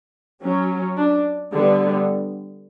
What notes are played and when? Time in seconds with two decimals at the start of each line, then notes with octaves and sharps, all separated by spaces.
0.43 F#3 C#4
0.97 D4
1.52 D3 G3 B3